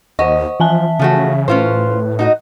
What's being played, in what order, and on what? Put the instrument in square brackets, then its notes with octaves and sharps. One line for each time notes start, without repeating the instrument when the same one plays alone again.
[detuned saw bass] D#2 [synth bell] C5 F#5 C#6 [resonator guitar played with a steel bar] D#5
[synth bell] E3 G#5 A5 [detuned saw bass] F3 [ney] E5
[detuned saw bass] C#3 [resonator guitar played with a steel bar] F3 A3 F#4
[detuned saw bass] A2 [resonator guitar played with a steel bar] C#4 F4 C5 [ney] B4
[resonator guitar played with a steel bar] D#4 F#4 D#5